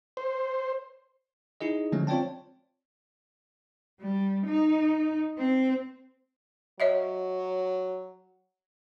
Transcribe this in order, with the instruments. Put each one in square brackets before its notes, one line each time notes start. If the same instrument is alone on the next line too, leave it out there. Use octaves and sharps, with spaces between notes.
[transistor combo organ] C5
[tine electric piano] D#4 E4 G#4 D#5
D3 F3 F#3 G#3 A3 C#4
C4 F4 C#5 D5 G5 A5
[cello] G3
D#4
C4
[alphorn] F#3 [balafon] C#5 D#5 E5